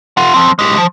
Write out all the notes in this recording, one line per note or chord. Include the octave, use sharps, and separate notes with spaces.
F4 F#5
F3 C4
G#3 G4
F3